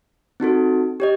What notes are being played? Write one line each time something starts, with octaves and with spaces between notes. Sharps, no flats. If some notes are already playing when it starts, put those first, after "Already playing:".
C4 D#4 F#4 A4
G4 C#5 D#5